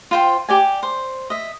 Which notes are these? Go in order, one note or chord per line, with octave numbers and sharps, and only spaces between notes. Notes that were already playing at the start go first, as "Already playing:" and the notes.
F4 C5 G5
G4 D5 G#5
C5
D#5 E5